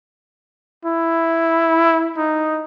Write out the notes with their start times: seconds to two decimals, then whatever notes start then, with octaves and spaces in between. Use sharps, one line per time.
0.85 E4
2.18 D#4